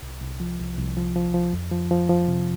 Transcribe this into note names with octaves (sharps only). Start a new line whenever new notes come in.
C2
C2
F3
C2
C2
F3
F3
F3
F2
F3
F3
F3
C3